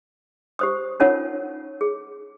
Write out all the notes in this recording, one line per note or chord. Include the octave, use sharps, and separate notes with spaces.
G4 C5 D#6
C#4 D#4 F4 A#4 C#5 F#5
G#4